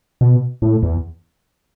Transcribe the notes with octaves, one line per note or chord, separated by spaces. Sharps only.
B2
A2
E2